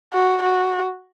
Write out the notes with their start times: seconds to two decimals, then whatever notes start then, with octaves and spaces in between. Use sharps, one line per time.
0.13 F#4
0.43 F#4